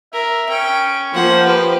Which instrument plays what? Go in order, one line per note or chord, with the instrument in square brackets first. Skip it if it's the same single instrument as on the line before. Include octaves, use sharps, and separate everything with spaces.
[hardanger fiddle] A#4 [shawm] E5
[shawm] C#4 [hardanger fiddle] G5
[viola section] F3 A#3 C5 [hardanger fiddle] F#5
[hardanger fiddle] G4 B4